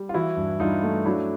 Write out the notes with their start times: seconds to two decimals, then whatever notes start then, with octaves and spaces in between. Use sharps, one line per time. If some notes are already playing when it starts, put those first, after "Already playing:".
Already playing: G3
0.09 F4
0.14 E3 E4 F#4
0.37 G2
0.60 G2 D#4 F4
0.83 A3
1.05 F#3 D4 E4